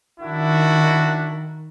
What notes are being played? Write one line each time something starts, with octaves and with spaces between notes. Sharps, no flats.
D#3 D4 E4 F#4